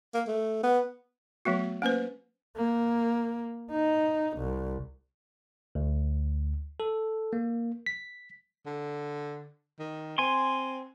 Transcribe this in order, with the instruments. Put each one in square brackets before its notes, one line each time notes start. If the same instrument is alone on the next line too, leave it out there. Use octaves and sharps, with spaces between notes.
[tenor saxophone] A#3
A3
B3
[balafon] F#3 A3 B3 F#4
A#3 C#4 B4 C5
[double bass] A#3
D#4
C2
[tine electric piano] D2
A4
A#3
B6
[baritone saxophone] D3
D#3
[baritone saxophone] C4 [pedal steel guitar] G#5 C6